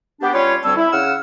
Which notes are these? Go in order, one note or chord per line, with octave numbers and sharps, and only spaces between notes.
B3 D4 G4
G3 C#4 F4 B4 C#5
D2 G3 C4 C#5 A5 E6
E4
C#3 F#5 E6 F6